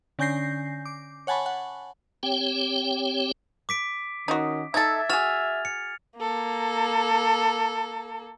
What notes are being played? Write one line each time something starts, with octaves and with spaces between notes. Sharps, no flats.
D3 C#4 G#5 G6 A#6 C7
D6
C#5 F#5 G#5 A5 B5 C#6
F#5
C4 G4 C#5 G5
D6 B6 D7
D#3 C#4 D#4 F#4 D#5
D#4 A4 E5 G#6 A6
F#4 G#4 F6 A6 F7
C#7
A#3 A4